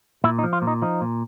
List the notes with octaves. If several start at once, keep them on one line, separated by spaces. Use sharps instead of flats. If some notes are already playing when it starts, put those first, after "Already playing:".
A#2 E4
D#4
F3
F4
A#2
D#4
F3 D#4
A#2